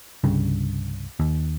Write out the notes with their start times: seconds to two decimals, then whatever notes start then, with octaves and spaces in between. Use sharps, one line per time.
0.24 C2 G2 C#3
1.20 D#2